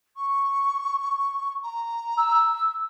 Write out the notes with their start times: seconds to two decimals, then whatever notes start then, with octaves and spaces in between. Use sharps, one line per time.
0.16 C#6
1.62 A#5
2.18 E6